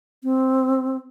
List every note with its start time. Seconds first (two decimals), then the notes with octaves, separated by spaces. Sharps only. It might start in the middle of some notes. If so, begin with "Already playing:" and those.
0.24 C4